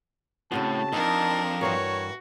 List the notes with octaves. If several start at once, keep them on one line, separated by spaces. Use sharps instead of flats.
A2 C#3 C4 F#4 A5
F2 D4 D#4 A#4
G2 E3 F#4 A#4 C#5